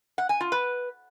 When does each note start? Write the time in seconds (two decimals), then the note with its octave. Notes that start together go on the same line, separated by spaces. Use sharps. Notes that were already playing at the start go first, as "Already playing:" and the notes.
0.18 F#5
0.29 G#5
0.41 F4
0.52 B4